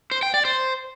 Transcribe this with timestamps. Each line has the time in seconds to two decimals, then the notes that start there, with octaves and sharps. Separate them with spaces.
0.11 C5
0.23 G5
0.34 D5
0.45 C5